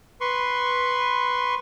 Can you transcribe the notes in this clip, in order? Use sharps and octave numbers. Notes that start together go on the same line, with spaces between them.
B4 C6 C#6